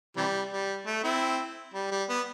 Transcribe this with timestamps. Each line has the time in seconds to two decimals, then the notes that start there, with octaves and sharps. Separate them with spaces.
0.17 C3 E3 G3
0.51 G3
0.86 A3
1.03 C4 E4
1.74 G3
1.91 G3
2.09 B3